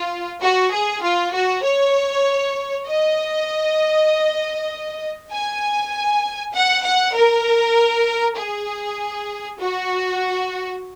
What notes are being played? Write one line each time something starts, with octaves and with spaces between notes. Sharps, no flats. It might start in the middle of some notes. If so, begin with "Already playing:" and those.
Already playing: F4
F#4
G#4
F4
F#4
C#5
D#5
G#5
F#5
F#5
A#4
G#4
F#4